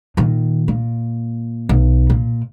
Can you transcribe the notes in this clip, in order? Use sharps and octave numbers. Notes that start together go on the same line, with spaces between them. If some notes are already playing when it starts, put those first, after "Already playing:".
A#2 D#3
A#2
B1
A#2